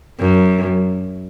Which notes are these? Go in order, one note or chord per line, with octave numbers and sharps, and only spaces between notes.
F#2